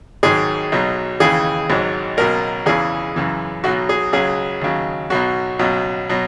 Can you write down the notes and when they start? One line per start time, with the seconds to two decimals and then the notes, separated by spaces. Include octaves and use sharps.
0.23 G#1 G#2 D#3 F#3 G#4
0.72 B1 B2 F#3
1.20 D#2 C#3 E3 G#4
1.70 G#1 G#2 F#3
2.17 C#2 B2 F#3 A#4
2.66 E2 C#3 E3 G#4
3.16 F#2 C#3 E3
3.64 B1 B2 F#3 F#4
3.89 G#4
4.13 C#2 C#3 F#3 G#4
4.61 D#2 C#3 F#3
5.10 B1 B2 F#3 F#4
5.59 C#2 B2 F#3
6.09 B2 F#3